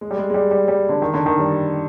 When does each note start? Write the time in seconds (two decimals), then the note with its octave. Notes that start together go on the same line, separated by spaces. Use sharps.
0.01 G#3
0.11 G3
0.18 G#3
0.30 G#3
0.34 G3
0.51 G3
0.68 G3
0.89 D3
1.02 D#3
1.14 D3
1.26 D#3
1.39 G3